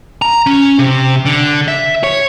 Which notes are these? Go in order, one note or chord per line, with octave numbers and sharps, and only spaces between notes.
A#5
C#4
C3
D3
E5
C#5